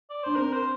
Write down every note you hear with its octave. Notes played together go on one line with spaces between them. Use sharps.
D5
D4 C5
C4 A#4
C5